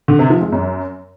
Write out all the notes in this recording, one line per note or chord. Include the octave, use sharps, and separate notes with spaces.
D3
C3
F3
G#3
F#2